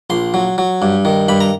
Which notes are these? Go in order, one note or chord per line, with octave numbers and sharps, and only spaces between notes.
A#1 C6
F#3
F#3
G2
D#3
G2 B5
A#5